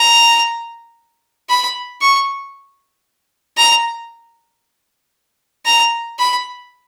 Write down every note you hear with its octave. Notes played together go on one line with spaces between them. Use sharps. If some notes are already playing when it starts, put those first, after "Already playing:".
Already playing: A#5
B5
C#6
A#5
A#5
B5